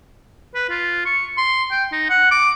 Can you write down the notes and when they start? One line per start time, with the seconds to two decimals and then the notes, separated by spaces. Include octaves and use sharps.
0.55 B4
0.70 F4
1.06 C#6
1.38 C6
1.71 G5
1.92 D#4
2.10 F#5
2.31 D6